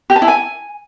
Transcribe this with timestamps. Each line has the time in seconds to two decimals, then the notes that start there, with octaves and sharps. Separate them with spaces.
0.10 G4
0.16 A5
0.22 E4
0.28 G#5